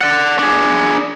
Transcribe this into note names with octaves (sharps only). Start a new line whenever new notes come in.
D5 F#5
D4 G#4